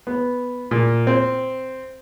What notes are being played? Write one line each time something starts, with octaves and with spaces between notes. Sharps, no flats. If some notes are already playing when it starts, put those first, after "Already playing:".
B3
A#2
C4